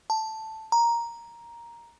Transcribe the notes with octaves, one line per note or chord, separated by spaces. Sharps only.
A5
A#5